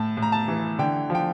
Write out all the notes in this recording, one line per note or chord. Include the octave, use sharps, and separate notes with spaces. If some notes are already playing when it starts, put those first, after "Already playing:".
Already playing: A2 A5
A2
A#5
A5
E3
D3 G5
F3 G5